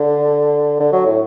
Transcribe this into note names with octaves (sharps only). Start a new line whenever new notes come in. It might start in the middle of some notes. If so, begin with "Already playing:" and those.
Already playing: D3
D3
F#3
A2